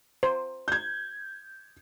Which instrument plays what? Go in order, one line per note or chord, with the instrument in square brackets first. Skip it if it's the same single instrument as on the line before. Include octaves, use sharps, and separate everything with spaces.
[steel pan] C5
[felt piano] G6 G#6